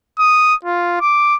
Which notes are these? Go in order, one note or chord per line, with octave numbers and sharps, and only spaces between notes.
D#6
F4
D6